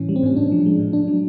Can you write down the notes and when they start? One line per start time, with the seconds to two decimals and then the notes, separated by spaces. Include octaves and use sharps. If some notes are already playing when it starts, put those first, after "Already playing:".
Already playing: A2 E3 C#4
0.09 G3
0.16 C4
0.23 A2 C#4
0.36 A2 D4
0.52 F3
0.66 G#3
0.79 A2
0.93 A2 D4
1.07 F#3